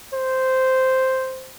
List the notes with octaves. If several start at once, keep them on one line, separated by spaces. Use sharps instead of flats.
C5